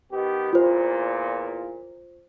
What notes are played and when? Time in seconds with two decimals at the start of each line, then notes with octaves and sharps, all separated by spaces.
0.12 D#3 B3 G4
0.53 E2 A#2 F4 C5